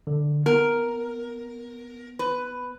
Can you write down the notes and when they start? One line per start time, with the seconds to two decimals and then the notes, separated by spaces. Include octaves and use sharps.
0.07 D3
0.46 B3 A#4
2.19 B4